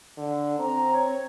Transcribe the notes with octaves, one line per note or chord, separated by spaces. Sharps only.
D3
C4 A#5
C#5